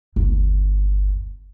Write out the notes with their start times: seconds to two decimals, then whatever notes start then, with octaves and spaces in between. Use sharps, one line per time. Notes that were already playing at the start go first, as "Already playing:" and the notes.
0.16 G1 D#2